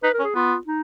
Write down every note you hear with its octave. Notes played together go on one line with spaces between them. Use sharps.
D#4 B4
A#4
C#4
G#4
B3 F4
D#4